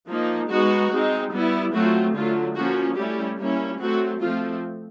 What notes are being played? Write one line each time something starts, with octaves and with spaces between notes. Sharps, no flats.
F3 A#3 D#4
G#3 B3 D#4 F#4
G#3 C4 D#4
G3 B3 E4
F#3 A3 C4 F4 F#4
D3 F#3 A3 F4
F3 A#3 C#4 F#4
G3 A3 C#4 E4 G4
G3 A#3 C#4 E4
F#3 A3 C4 F#4
F3 A3 C4 F4